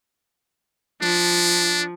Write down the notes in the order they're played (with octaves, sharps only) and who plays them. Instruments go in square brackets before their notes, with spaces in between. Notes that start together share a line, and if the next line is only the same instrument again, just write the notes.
[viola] F3 [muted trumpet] D4